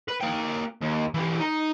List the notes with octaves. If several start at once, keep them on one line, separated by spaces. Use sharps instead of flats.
B4
A#3 G5
D#2
E3 G4
D#4